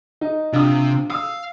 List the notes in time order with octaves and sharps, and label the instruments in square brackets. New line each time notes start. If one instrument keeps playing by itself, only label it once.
[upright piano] D#4
[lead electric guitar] C3 [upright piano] D4 F4 D#6
[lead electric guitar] F5 [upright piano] D#6 E6